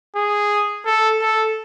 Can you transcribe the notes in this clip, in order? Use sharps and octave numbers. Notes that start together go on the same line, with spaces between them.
G#4
A4
A4